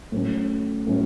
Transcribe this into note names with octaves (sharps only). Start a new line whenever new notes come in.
A2 F#3 C#4
A2 F#3 C#4